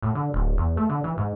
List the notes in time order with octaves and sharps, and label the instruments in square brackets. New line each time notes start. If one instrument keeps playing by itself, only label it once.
[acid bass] A2
D3
D1
E2
A3
D3
E3
G#2